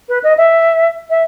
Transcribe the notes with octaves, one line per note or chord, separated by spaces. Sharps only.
B4
D#5
E5
E5